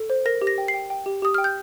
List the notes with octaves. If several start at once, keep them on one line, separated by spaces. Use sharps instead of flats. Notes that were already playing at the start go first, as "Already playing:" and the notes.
Already playing: A4
C5
A#4 A#6
G4
A#6
G5
C7
G5
G5
G4
G4 D#6
G5 F6
G6